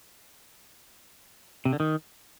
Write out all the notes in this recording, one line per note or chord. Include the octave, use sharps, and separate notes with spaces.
C3
D3
D#3